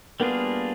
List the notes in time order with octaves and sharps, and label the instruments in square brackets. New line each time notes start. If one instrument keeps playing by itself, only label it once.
[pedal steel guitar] G3 A#3 D4 F4 G#4 [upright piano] B3